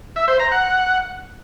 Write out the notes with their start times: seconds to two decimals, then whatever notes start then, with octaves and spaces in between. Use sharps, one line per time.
0.16 E5
0.28 C5
0.40 A#5
0.51 F#5